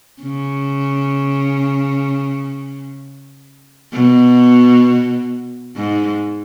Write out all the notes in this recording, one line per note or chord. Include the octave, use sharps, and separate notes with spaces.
C#3
B2
G#2